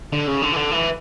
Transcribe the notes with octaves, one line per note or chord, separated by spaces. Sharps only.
D3
C#3
D3
E3
D3
E3